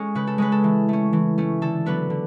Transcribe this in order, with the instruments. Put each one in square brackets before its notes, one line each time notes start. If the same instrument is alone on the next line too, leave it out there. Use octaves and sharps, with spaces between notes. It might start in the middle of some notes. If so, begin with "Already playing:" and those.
Already playing: [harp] G#3 C#4 A4
C#3 B4
A4
G#3 C#4 B4
A4
E3
A3 C#4
E3
A3 C#4
D3 A4
F#3 B3 D4 B4
D3